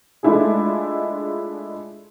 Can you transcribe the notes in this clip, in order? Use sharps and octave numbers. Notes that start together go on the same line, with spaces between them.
G#3 A3 D4 E4 F4 G#4